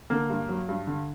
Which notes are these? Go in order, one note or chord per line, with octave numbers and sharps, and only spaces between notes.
D3 A#3
G2
F#3
G2
D3